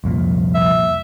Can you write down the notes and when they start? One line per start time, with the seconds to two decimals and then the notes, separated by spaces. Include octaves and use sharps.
0.04 C2 F2 A#2
0.54 E5